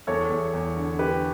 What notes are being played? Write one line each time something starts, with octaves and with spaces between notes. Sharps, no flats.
E2 A4 C#5
E2
E2
D3
D3 G4 B4